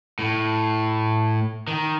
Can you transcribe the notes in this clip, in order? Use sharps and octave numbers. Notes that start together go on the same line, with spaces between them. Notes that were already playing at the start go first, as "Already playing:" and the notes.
A2
D#3